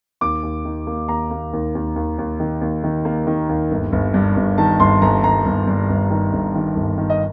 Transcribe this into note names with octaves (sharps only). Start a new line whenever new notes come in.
D#2 D6
D#2
D#3
A#3
D#2 A#5
A#3
D#2
D#2
D#2
D#2
D#3
D#2
D#3
A#3
D#3
D#2
G1
G1
G2
G1
D#3 A5
G1 C6
G1 A#5
G1 A#5
G1
G2
G1
D#3
G1
D#3
G1
D#3
D#5